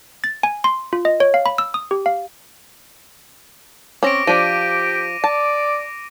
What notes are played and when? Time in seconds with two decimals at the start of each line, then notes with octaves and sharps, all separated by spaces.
0.24 A6
0.43 G#5
0.64 C6
0.93 F4
1.05 D#5
1.20 C#5
1.34 F5
1.46 B5
1.58 E6
1.74 D#6
1.91 G4
2.06 F5
4.03 C4 C#4 D6 A#6 D7
4.27 F3 D4 G4 A#6 D#7
5.24 D5 A5